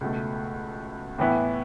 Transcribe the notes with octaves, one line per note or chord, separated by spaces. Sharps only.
C#2 B2 A3
A2 E3 B3 E4